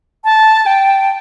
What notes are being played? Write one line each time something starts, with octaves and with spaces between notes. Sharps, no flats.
A5
G5